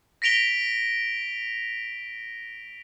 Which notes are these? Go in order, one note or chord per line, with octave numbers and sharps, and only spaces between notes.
A#6 B6 D7 F7 G7